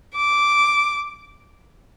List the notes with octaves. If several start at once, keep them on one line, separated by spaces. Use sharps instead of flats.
D6